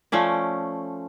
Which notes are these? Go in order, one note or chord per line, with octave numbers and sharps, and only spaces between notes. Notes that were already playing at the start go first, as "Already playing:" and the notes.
F3 A3 C#4 D5